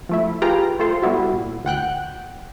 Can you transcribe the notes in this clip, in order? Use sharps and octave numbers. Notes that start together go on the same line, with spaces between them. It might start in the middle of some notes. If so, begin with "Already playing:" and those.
F3 A3 E4
F4 G4 G#4 B4 G5 A#5
A3 F4 A4 C5
G3 B3 E4 F#4
A#2
D2 F#5 G5 F#6